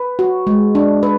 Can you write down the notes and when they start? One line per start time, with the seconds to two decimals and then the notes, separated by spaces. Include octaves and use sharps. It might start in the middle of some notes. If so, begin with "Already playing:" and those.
Already playing: B4
0.19 F#4
0.47 G#3
0.75 D4
1.03 B4